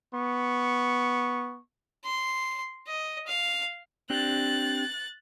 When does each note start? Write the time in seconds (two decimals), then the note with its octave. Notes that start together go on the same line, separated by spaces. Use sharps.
0.14 B3 C#6
2.04 C6
2.87 D#5
3.27 F5
4.10 C4 D4 G4 F#6 A6